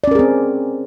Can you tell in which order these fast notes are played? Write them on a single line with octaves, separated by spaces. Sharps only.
D5 C#4 A#4 G#4 C4